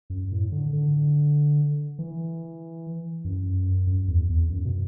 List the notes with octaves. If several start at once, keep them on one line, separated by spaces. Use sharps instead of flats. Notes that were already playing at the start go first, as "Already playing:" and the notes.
F#2
A2
D3
D3
E3
F#2
F#2
E2
E2
F#2
B2